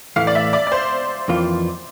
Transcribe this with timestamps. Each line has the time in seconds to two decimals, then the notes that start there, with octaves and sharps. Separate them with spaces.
0.16 A2 E3 A3 F5
0.27 D5
0.35 E5
0.53 D5
0.67 D5
0.72 C5
1.28 F2 E3 A#3 F4